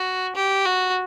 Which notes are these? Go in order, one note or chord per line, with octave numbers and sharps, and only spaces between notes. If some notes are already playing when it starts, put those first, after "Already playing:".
Already playing: F#4
G4
F#4